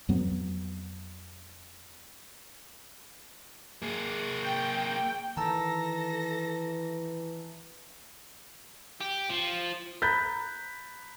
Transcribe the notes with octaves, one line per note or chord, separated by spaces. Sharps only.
F2 F#3 B3
A#3 G#4
G5
D#3 E3 A4 A5 A#5 E6 A#6
G4
F3
A#5 B5 F#6 G6 A6 B6